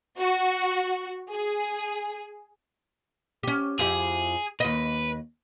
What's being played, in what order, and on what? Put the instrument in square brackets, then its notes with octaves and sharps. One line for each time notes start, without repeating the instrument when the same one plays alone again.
[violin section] F#4
G#4
[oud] C#4 G4
[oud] F2 E4 G4 [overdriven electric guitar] G#4
[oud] D#2 D#5 [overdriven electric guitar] B4